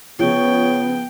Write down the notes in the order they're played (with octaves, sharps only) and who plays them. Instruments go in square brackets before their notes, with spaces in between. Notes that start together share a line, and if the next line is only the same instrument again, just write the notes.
[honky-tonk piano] C#3 F3 [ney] B3 [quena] C#5 [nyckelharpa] G5